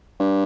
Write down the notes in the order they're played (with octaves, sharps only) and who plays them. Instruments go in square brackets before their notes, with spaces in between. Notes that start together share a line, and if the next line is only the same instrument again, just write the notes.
[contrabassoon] G2